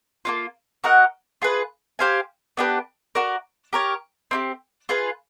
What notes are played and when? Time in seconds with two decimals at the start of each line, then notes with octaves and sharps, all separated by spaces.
0.25 A#3 C#4 F4
0.84 F#4 A#4 D#5 F#5
1.42 F4 G#4 B4
1.99 G4 C5 F5 G#5
2.57 B3 D4 G4 B4
3.15 F#4 A#4 D5
3.73 G4 A#4 C#5
4.31 C4 E4 G4
4.89 F4 G#4 B4